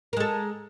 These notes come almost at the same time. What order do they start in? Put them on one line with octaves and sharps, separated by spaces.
A#4 G#3 A4